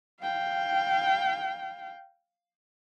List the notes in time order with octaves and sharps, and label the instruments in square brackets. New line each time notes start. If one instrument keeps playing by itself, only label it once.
[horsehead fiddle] F5 G5